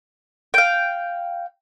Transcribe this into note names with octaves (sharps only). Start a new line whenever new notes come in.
F5 G5